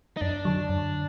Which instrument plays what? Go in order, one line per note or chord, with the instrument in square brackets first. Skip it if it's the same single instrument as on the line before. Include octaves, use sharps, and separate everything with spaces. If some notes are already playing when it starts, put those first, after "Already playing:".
[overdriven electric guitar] D#4
[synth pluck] F#2 [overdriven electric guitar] D4
[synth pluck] D3 F#3
F#2